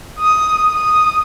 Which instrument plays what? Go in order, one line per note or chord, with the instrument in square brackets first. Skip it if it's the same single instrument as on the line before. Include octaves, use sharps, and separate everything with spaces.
[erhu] D#6
D#6